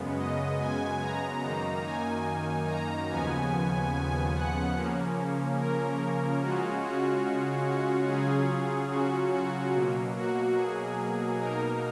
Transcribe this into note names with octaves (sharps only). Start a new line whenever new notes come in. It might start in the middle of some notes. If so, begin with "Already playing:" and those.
Already playing: F#2 C#3 G#3 B3
D#5
G#5
A#5
F#2 D#3 A#3 D#4
G#5
A#5
D#2 C#3 F3 B3 G#5
G#5
F#5
C#3 F3 A#3 C#4
A#4
C#3 G#3 C#4 F4 F#4
F#4
F#4
C#3 F#3 C#4 F4 G#4
F#4
F#4
B2 F#3 A#3
F#4
G#4
B2 A#3 D#4 A#4